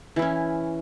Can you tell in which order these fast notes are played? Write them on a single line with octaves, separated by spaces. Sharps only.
E3 E4 C#4